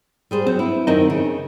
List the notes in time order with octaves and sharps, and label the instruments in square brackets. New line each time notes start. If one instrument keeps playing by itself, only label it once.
[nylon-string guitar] G3 G#4 C5
[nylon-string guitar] F#3 [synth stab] C4
[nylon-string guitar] B3 E4
[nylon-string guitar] F#2 D#3 [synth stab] C4 D#4
[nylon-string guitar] C#3